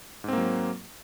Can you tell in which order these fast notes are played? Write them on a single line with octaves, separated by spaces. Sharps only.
G#2 C4 A#3 F#3